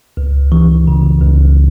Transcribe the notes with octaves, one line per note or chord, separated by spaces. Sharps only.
C#2
E3
C#3
C#2